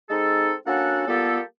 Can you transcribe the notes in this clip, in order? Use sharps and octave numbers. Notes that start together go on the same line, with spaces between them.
G#3 C4 D#4 G#4 A4
A#3 C#4 D4 F#4 A4 F#5
G3 A#3 B3 F4 G4 A4